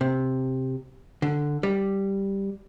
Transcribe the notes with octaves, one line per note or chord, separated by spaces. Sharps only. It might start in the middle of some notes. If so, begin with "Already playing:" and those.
C3
D3
G3